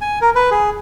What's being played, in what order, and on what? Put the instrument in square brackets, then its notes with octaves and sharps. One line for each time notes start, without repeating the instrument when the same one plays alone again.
[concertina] G#5
A#4
B4
G#4